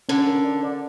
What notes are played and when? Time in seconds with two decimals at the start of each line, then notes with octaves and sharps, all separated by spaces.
0.09 D3 C#4
0.27 A#4
0.45 D5
0.63 D5